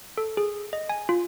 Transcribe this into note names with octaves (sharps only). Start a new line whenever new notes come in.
A4
G#4
D#5
G#5
F4